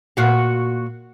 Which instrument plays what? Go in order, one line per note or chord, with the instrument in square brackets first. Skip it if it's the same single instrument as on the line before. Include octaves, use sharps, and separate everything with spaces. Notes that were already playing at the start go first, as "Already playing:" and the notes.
[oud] A#2 F#4 F5